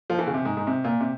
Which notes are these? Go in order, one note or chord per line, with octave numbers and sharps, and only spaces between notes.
F3
E3
C#3
C3
G#2
G#2
C3
A#2
C3